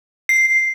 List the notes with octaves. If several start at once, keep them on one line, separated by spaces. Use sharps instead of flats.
C7